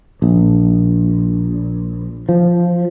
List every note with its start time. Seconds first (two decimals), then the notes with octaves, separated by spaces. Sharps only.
0.22 A#1
2.29 F3